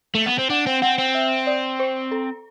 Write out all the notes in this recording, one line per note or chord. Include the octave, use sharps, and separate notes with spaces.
A3
B3
C4
D4 F#5
C4
C4 F#5
C4
E5
D5
C5
A4